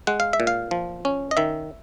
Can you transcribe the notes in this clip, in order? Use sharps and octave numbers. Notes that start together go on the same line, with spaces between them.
G#3 F#5
F5
E5
A#2
F5
F3
C#4
D#5
D#3 E5